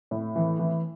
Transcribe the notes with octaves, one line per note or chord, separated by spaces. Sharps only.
A2
E3
E3